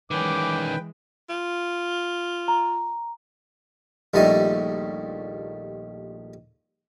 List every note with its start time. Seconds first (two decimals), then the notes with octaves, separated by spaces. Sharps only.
0.11 D#3 E3 G#3 C#4 B4 G5 D6
1.29 F4
2.48 A#5
4.14 A#1 D#2 G3 A3 D#4 G#5